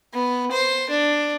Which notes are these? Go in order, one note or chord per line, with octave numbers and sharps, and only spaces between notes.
B3
C5
D4